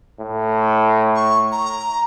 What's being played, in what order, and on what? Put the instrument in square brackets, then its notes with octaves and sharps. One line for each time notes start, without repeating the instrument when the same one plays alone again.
[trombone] A2
[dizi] C#6
A#5